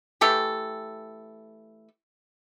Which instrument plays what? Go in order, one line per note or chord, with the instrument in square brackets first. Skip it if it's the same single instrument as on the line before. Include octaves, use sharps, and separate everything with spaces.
[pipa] E3 A3 G4 A4